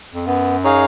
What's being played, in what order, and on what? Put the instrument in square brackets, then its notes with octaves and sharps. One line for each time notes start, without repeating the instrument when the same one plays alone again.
[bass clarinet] F2
[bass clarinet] F#2 [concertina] B3
[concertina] D#4 G#4 C#5 F5